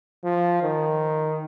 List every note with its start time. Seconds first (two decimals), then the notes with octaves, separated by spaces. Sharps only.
0.24 F3
0.63 D#3